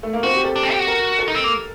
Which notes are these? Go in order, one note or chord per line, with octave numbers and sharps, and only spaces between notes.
A3
A#3
C4 F#4
G4
A4
D4
C4
G4
F#4
A#4
A4
D#4
C4
A#3